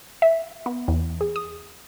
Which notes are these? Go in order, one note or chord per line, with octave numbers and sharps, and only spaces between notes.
E5
B3
E2
G#4
D#6